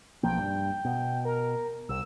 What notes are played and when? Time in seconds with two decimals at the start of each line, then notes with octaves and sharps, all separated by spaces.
0.23 B1 F3 A#3 G5
0.38 G2
0.85 B2
1.25 A#4
1.89 C2 E6